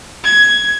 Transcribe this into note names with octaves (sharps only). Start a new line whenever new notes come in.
G#6